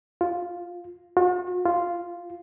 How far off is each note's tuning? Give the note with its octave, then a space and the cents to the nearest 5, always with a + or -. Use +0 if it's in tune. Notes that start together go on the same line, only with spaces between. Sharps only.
F4 +5
F#4 -45
F4 -5